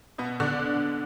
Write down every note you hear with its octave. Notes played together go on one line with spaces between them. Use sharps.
B2 B3
D3 D4